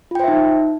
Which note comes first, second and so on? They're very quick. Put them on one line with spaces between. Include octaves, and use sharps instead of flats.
F4 G5 C5 E5 D#4